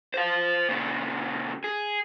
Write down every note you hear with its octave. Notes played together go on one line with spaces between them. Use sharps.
C5 F5
A#2 C#3
G#4